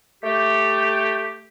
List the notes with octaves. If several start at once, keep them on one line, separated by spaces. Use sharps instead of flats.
A3 G4